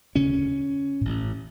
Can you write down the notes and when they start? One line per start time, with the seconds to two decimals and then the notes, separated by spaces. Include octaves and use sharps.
0.15 E1 D2 C#3 C#4
1.01 A1 A2